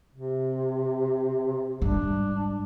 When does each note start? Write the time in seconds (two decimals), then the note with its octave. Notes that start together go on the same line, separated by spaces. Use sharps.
0.15 C3
1.82 G#2 G3 D4